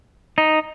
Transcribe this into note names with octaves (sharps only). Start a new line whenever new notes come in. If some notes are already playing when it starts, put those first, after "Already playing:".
D#4